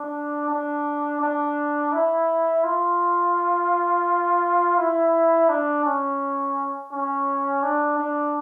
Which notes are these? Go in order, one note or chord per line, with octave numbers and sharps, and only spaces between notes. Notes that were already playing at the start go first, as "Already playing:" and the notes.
Already playing: D4
D4
D4
E4
F4
E4
D4
C#4
C#4
D4
D4